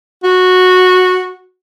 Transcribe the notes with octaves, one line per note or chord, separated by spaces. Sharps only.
F#4